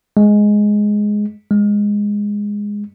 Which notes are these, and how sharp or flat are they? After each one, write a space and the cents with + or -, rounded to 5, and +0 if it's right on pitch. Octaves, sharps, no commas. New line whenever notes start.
G#3 +5
G#3 -10